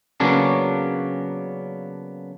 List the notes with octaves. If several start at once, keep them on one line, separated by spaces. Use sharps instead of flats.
C#3 F#3 A#3 B3 C#4 D4